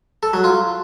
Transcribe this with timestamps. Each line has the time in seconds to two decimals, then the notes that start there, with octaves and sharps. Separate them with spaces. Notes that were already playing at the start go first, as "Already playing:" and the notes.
0.23 A4
0.33 F#3
0.44 F4